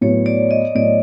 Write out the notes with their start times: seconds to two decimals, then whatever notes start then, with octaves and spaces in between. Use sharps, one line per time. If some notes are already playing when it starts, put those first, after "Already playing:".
0.01 A2 F#3 B3 C#5
0.26 D5
0.51 D#5
0.75 A2 F#3 B3 D5